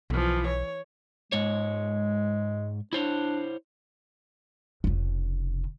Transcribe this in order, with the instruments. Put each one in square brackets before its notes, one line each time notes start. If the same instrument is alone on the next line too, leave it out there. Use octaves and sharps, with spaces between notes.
[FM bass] B1 [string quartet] E3 F3
[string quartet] C#5
[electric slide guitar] G#2 C#5 [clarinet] G#3
[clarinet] D4 [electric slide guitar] E4 C5 C#5
[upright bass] F1 C#3